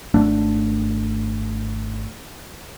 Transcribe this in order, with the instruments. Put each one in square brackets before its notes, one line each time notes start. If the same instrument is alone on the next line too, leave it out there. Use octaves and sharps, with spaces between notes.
[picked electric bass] G#1 A3 D4